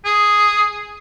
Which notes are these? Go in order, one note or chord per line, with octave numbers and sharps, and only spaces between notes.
G#4